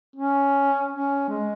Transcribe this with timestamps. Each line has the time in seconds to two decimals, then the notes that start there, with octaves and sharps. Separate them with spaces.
0.16 C#4
0.91 C#4
1.29 G#3